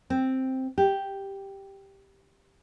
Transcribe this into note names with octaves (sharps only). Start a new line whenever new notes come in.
C4
G4